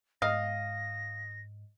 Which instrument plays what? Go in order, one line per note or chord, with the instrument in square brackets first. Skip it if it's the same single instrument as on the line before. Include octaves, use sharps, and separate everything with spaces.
[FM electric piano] G#2 [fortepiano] D#5 [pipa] F5 [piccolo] A#6